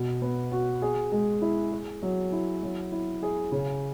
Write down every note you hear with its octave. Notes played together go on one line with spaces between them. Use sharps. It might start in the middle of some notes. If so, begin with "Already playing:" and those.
Already playing: B2
B3
F#4
G#4
G#3
E4
G#4
F#3
E4
F#3
E4
G#4
C#3